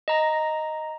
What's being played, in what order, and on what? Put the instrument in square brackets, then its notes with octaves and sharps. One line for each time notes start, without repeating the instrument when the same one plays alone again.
[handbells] D#5 A#5 A#6